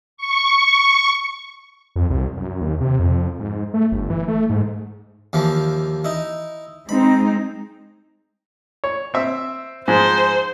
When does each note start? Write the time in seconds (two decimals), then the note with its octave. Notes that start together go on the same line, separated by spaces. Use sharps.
0.17 C#6
1.96 F2
2.10 C2
2.37 F#2
2.61 D#2
2.81 C3
2.99 F2
3.39 G#2
3.74 A3
3.92 G1
4.10 E3
4.28 A3
4.50 G#2
5.33 D#2 E3 F3
6.05 D#4 E4
6.89 G#3 C4 D#4 B5
8.84 C#5
9.14 C4 E5
9.88 G#2 F3 G#4 C5